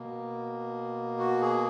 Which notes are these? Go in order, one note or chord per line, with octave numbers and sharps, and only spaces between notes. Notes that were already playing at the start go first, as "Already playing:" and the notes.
Already playing: B2 A#3
F#4
G#4